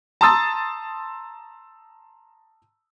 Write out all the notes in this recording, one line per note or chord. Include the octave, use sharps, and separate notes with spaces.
A5 A#5 C6 D#6 E6 A6